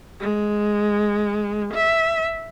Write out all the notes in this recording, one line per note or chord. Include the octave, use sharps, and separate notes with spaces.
G#3
E5